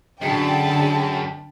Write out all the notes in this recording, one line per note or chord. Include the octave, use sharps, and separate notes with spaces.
F#2 D3 G#4 G5 A5 B5